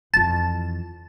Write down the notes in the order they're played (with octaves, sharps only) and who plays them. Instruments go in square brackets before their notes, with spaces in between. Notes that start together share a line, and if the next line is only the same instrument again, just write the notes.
[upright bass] F2 E3 [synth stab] A5